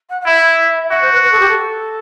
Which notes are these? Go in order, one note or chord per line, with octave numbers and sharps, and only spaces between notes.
F#5
F#5
E4 E5
F#4 E5
C5
B4
B4
A4
G4
A4